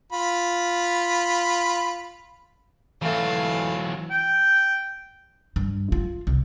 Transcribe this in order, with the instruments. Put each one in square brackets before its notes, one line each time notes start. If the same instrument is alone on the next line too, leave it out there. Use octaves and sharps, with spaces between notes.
[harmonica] F4 B5
[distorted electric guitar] E3 F#3 [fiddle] A3 F5
[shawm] G5
[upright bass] G2
F4
C2